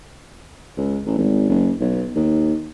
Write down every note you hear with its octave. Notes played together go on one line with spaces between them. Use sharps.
C#2
A1
G#1
F#1
B1
D#2